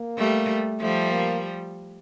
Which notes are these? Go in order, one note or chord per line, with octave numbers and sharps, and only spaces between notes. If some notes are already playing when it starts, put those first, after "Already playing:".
Already playing: A#3
G3 A3
F3 G3 A3
A#3